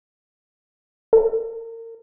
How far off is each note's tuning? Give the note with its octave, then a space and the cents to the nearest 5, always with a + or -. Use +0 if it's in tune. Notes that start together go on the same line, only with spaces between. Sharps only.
A#4 -35